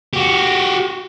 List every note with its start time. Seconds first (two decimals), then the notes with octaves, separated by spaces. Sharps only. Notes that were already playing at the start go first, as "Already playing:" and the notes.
0.13 F#4 G4